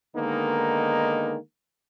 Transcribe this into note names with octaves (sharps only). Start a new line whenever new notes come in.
D3 D#3 G#3 A#3 B3 D#4